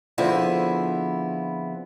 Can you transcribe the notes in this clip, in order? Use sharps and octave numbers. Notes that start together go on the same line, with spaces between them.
D3 F3 B3 C4 E4 G#4